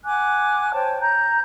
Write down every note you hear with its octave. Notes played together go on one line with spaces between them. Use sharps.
F#5 G#5 D6 F#6
C5 C#5 G5 A5
A#5 G6